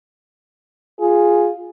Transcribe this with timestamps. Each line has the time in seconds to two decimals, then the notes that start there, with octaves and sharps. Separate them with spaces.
1.00 F4 G#4